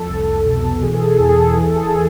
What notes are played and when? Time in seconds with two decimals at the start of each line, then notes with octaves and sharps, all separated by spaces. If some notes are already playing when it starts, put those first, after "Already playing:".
Already playing: F2 A4
0.09 C2
0.46 B2
0.82 E3 G#4
0.95 A4
1.06 G#4
1.17 E2 A4
1.29 G#4
1.41 A4
1.53 E3 G#4
1.64 A4
1.76 G#4